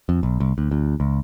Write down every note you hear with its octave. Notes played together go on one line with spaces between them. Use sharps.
F2
B1
C2
D2
D2
C#2